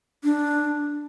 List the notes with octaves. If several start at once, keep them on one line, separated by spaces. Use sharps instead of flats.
D4